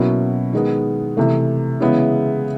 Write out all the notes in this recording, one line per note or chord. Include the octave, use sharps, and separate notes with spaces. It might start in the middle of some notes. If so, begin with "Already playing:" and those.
Already playing: B2 F#3 A#3 C#4 E4
D#3 G#3 B3
C3 E3 A3
C#3 E3 G#3 B3 E4